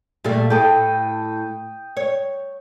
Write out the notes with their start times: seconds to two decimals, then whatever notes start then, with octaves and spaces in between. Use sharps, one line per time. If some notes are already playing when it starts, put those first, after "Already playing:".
0.24 A#2 G3 A3
0.50 A2 A4 G5 D#6
1.97 C#5